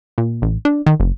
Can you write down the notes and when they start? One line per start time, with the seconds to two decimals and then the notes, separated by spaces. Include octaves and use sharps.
0.18 A#2
0.42 A1
0.65 D4
0.86 D#3
1.00 F#1